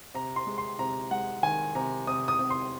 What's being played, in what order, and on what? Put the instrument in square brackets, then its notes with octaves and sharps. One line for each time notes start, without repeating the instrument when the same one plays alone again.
[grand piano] C3 A#5
C6
G#3
C6
C3 A#5
G#3 F#5
D#3 G#5
C3 A#5
C3 D#6
D#6
C3
C6